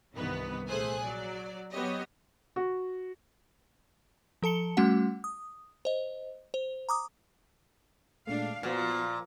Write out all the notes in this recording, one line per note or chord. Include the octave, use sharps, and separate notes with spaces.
C2 G2 D#3 E3 B3 B4
A#1 A3 G#4 C5 G#5 F#6
F#3 D5
F#3 B3 C4 G4 C#5 D#5
F#4
F3 A4 A5 C#7 G7
G3 A3 C#4 F#4 F#5
D#6
C5 D#5
C5
A#5 D6 D#6
A#2 G#3 A3 D4 F5
A#2 F3 B3 F#4 F6